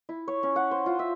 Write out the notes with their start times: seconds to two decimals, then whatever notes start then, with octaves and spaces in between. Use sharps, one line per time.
0.09 E4
0.28 C#5
0.43 C#4
0.56 F#5
0.71 C5
0.86 F4
0.99 E5